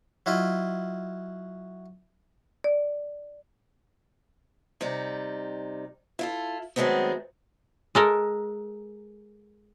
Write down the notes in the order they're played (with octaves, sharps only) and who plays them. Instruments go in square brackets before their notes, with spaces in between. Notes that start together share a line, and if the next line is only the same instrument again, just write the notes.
[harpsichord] F#3 E4 F4 D#5
[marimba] D5
[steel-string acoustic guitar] C3 G3 D#4
E4 F4 A4
D#3 F#3 G#3 A3 B3 C4
[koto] G#3 A4 A#4